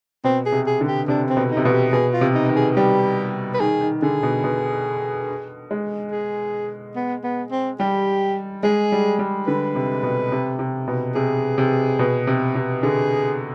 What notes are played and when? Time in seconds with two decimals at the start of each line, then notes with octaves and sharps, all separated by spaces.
0.24 B2 C4
0.46 G#4
0.52 C3
0.67 G#4
0.81 D3
0.87 G4
1.08 C3 D4
1.30 C4
1.37 B2
1.51 D#4
1.57 C3
1.65 B2 F4
1.72 G4
1.93 B2 G#4
2.13 F4
2.21 C3
2.35 D#4
2.49 D#3
2.56 G#4
2.76 G3 G4
3.54 B4
3.60 D#3 G#4
3.81 D#3
4.02 D3 G#4
4.23 B2
4.44 B2
5.71 G#3
6.12 G#4
6.96 B3
7.24 B3
7.52 C4
7.80 G3 G4
8.63 G#3 G#4
8.92 G3
9.19 G3
9.47 D3 B4
9.75 C3
10.03 B2
10.32 C3
10.59 C3
10.88 B2
11.15 C3 G#4
11.58 C3
11.99 B2
12.27 C3
12.55 C3
12.83 D3 G#4